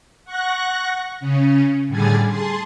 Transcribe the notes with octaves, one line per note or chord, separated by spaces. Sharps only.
F#5 C#6 F#6 A#6
C#3 C#4
A2 D3 G3 G#4 G#5 A6
G#4 A5 C6